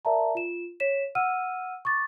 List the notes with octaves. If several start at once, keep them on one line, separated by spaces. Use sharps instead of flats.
A#4 D5 E5 A5 A#5
F4 E7
C#5 B6 E7
F#5 E6 F6 D#7
C#6 D6 A6